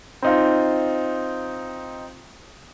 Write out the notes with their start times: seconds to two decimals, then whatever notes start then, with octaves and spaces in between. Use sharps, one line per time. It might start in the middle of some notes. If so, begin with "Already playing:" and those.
0.22 C4 D#4 F4